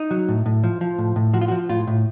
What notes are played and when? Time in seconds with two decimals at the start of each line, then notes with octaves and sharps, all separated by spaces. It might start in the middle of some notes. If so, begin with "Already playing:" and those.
Already playing: D#4
0.11 F#3
0.29 A2
0.46 A2
0.64 F3
0.81 F3
0.98 A2
1.16 A2
1.34 F3 F#4
1.41 F4
1.48 F#4
1.52 F3
1.69 A2 F4
1.87 A2